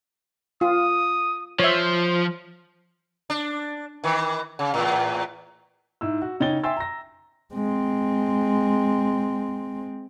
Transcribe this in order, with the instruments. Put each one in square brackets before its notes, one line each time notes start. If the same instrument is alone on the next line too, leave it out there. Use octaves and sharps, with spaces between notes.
[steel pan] F4 [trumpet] D#6
[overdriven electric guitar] F3 [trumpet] C5 [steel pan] C#5 E5
[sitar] D4
D#3 E3
C#3
E2 A2
[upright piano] G#2 E4 E6
F#4
C#3 D#4 C#5 G5 A6 G7
E5 G5 G#5 C6 E6 A6
A#5 A#6
[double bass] G#3 C4